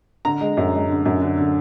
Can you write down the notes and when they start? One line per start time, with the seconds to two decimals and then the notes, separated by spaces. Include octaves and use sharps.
0.25 D3 A#5
0.41 G#3
0.57 F#2
0.74 G#3
0.89 D3
1.06 F#2
1.22 D3
1.37 D3